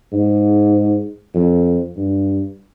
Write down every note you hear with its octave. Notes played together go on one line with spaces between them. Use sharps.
G#2
F2
G2